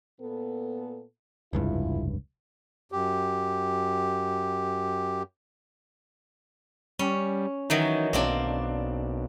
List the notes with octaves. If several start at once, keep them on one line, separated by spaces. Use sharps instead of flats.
A#2 B3 A4
F1 C#2 G2 G#3 E4 F4
F#2 G4
G3 C#4
D#3 E3 F#3 D#4
B1 A#3 C4 D4